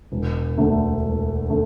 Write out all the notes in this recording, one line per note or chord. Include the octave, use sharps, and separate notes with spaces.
E1
D2 D3 A3
E1
D3 A3